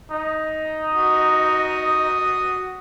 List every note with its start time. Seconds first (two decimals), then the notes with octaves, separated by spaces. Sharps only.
0.12 D#4
0.94 F#4 D#6